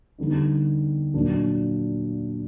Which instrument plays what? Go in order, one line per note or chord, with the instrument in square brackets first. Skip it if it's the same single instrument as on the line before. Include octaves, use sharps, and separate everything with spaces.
[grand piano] D3 G3 B3 D#4
A#2 F#3 A#3 D4